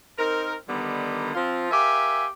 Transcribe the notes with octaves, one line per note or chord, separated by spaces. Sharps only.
C4 D#4 A#4
D3 D#3 G3 B3 D#4
F3 C4 F4
G4 A#4 E5 F5 G#5